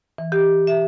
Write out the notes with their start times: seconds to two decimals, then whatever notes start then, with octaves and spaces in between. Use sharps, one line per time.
0.18 E3
0.32 G4
0.67 E5